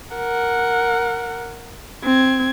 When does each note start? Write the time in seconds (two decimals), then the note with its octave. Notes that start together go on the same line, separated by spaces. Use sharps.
0.16 A#4 F#5
2.04 C4 G#6